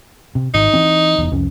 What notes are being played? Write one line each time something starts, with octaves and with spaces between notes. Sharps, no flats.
C3
G#1 D#4
E3 C4
F1 E2
C2 F2 C#4